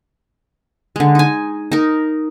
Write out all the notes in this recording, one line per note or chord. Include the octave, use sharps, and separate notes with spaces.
D3 G#3
D#4 G#5
D#4 A#4